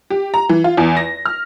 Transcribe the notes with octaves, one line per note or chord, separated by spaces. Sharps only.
G4
A#5
E3
F4
E2
A#6
F6